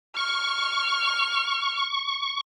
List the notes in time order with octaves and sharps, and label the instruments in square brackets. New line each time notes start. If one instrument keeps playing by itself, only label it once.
[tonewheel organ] C#6 [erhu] F6